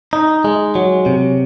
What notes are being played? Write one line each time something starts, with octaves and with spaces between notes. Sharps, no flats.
D#4
G#3
F#3
C3